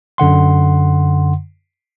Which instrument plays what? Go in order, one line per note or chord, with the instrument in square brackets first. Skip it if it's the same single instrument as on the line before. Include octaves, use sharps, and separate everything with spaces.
[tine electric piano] F#2 D3 F#5 C6